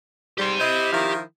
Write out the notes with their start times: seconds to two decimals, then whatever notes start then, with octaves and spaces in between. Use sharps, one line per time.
0.38 G#2 G3 G4 C6
0.60 E4 C5 D#5
0.92 D#3 F3 E4